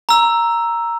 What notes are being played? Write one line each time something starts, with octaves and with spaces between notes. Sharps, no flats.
A#5 E6